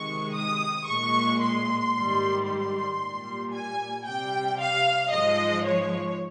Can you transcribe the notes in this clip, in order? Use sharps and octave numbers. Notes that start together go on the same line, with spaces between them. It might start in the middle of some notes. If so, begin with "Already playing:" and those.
Already playing: C3 D#3 G#3 C#6
D#6
A#2 G#3 C#6
C6
G#2 D#3 G3
C6
A#2 G3
G#5
C3 G3 G5
F5
G#2 F3 G#3 D#5
C#5